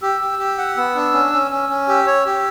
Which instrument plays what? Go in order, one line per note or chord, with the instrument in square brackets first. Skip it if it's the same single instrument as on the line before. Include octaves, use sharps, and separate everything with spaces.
[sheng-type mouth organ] G4 [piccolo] E6
[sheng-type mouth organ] G4
G4
F#5
[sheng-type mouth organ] B3 [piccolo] E6
[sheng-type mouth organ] D4
C#4
C#4
[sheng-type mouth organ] C#4 [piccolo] E6
[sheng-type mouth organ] C#4
[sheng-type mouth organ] G4 [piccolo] E6
[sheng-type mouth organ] C#5
G4